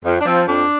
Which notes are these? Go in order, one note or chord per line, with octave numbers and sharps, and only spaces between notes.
F2
D4
F3 C4
F2 D4